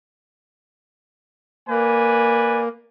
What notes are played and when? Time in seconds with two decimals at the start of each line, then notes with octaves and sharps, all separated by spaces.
1.69 A#3 B4 D5 G#5